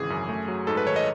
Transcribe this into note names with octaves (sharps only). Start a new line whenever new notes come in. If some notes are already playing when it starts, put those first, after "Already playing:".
Already playing: G#1 C#3 E3 G#4
F#2
A3
F#3
G#2 A4
B4
D#3 C#5
D#5